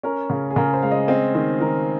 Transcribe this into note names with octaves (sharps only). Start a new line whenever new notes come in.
C#4 A#4
C#3
G#4
C#3 A#4
C5
G#3 F5
D#5
C4 D#5
D#3 C5
D#3 A#4